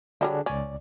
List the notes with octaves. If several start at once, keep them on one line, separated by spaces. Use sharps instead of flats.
D3 F#3 G3 A3 D4 G#4
C#2 C#4 D5